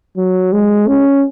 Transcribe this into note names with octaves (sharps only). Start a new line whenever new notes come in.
F#3
G#3
C#4